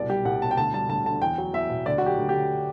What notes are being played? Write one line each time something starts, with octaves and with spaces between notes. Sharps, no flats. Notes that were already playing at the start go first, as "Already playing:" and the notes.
Already playing: C2 B2 D5
G3 G4
C2 F#5
B2 A5
G5
D2 A5
G3 A5
D2 A5
D3 A5
E2 G5
F#3
E2 E5
B2
D2 D5
F#3 F#4
G4
D2
D3 G4